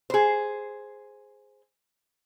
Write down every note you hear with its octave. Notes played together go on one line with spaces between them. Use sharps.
G#4 C5